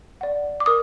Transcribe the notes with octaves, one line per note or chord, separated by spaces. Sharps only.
D5 F#5
D6
A#4 D#6